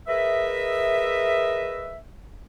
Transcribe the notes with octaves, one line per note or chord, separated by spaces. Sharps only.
G#4 A#4 B4 D#5 E5